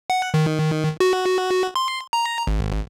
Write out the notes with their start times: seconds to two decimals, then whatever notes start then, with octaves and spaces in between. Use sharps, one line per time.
0.10 F#5
0.34 D#3
1.00 F#4
1.76 C6
2.13 A#5
2.47 G#1